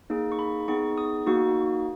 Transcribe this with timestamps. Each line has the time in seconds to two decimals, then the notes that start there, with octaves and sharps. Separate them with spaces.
0.10 A#3 D#4 G#4
0.32 C#6
0.39 B5
0.68 B3 D#4 G#4 C#6
0.98 D#6
1.27 A#3 D#4 F#4 C#6